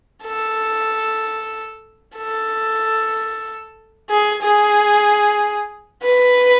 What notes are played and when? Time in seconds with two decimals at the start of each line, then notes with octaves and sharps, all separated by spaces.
0.24 A4
2.17 A4
4.10 G#4
4.42 G#4
6.03 B4